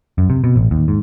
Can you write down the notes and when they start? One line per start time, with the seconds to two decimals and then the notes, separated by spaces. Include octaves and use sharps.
0.18 F#2
0.30 C3
0.44 B2
0.56 A1
0.71 D#2
0.88 G#2